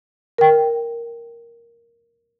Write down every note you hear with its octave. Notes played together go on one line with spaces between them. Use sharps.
A#4 G5